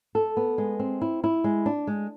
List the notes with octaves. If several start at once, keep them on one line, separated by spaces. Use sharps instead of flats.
A4
B3
G#3
C4
E4
E4
G#3
D4
G#3